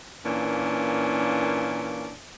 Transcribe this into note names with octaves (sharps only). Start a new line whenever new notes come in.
A#2 E3 A#3 C#4 D4